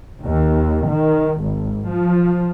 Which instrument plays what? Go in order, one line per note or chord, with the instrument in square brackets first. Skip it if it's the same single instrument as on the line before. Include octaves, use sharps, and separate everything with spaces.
[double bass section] D#2
D#3
G#1
F3